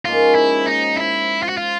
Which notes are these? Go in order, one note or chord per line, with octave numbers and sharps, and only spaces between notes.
G#2 F3 A#3 C#4 F4
E4
D#4
E4
F4
F#4
F4